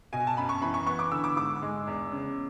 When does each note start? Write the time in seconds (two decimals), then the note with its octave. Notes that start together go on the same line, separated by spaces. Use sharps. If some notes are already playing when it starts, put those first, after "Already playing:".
0.13 B2 G#5
0.27 A5
0.37 F#2 B5
0.49 C#6
0.61 E3 B5
0.74 C#6
0.86 B3 C#6
0.99 D6
1.12 D3 E6
1.24 D6
1.36 G#2 D6
1.62 G#3
1.87 E2
2.12 C#3